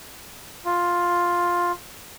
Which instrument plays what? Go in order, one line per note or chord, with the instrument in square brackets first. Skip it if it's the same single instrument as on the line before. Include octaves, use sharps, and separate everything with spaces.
[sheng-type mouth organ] F4